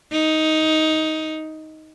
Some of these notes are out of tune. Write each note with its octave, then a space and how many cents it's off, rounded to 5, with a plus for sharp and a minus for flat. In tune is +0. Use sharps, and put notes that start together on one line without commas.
D#4 +10